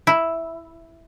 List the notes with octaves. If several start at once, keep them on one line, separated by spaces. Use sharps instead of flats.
E4